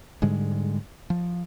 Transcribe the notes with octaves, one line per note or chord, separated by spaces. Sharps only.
G#2 D3 G3 G#3
F3